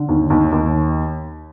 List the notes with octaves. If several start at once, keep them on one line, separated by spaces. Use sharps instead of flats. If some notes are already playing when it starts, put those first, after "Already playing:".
Already playing: D3
D#2
D#2
D#2